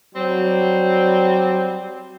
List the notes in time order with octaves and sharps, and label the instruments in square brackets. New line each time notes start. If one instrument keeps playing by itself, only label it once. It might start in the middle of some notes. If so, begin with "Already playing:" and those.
[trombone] F#3 [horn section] G3 C4